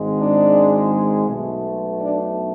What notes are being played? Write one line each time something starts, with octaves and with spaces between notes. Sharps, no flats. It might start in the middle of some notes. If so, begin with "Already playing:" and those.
Already playing: G#1 G#2 G#3
D4
B1 B2 A3
D4